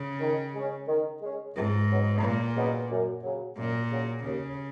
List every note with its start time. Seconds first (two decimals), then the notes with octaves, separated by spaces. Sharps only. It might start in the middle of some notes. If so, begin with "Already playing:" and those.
Already playing: C#3
0.20 D#3
0.54 G#3 C#4
0.88 D#3
1.21 G#3 C#4
1.56 C#2 G#2
1.89 C#3 F#3 B3 D#4
2.22 C#2 A#2
2.56 C#3 F#3 B3 D#4
2.90 F#2
3.23 C#3 F#3
3.57 F#2 A#2
3.91 C#3 F#3
4.24 D#2 C#3